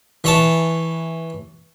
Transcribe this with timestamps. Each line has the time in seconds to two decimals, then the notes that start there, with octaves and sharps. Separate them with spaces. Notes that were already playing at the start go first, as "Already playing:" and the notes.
0.24 E3 C#5 A5